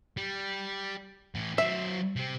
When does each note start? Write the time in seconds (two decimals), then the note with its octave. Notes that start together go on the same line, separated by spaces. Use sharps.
0.17 G3
1.35 A2 E3
1.58 F#3 C5 E5
2.16 C3 C4